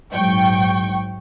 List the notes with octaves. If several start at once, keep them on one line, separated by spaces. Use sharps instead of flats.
A#1 G#2 F#3 G5 C#6